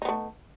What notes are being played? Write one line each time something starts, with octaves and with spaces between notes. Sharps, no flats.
A3 B3 D#4